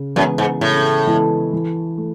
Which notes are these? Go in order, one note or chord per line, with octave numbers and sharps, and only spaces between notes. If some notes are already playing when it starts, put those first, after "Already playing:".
Already playing: C#3
F#2 E3 G#3 B3 E4
G#2
A2 C#3
E3 G#3 B3 E4
E3
A3